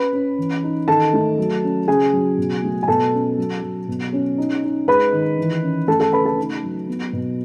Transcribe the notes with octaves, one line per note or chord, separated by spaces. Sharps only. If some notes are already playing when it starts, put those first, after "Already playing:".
Already playing: C#4 B4 B5
C#4
E3
D#4
D#3 A4 A5
A3
F#3
C#4
C#3 G#4 G#5
F#3
B2
A3
G#5
B2 A4 A5
C#4
F#3
F#3
B2
C#4
D#4
D#4
G#3 B4 B5
D#3
E3
C#4
A3 A4 A5
A4 A5
C#3 B4 B5
A4 A5
D#4
F#3
B3
B2